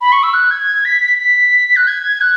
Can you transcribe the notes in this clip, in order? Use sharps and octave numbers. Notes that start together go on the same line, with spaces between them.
B5
C#6
E6
F#6
G#6
B6
B6
F#6
G#6
F#6